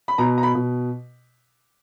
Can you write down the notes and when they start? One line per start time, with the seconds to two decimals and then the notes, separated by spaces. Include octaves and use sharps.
0.08 B5
0.18 B2 A#5
0.38 A#5
0.43 B5
0.55 B2